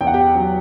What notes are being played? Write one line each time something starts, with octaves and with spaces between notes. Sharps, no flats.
E2 G5
F#5
G4 G5
F#3